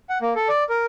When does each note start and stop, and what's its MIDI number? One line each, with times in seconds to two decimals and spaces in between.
0.09 0.18 78
0.22 0.34 58
0.35 0.48 69
0.48 0.64 74
0.69 0.86 70